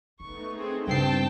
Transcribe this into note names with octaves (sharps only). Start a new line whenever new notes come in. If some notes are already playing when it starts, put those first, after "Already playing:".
A3 B3 C#4 D#4 C#6
C4 G#4
G2 C#3 G#3 C4 G5 A5 C7